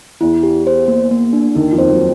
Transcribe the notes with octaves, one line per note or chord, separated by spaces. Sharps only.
E2 E3 E4
G4
C5
A#3
A#3
D4
D#2 D#3 D#4
F2 F3
C5
F#3